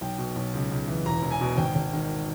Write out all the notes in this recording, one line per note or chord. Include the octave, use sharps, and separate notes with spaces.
B1 G5
B2
B1
C#2
C#2
E3
E1 A#5
E1
G#5
B2
G#1 G5
G#1
D#3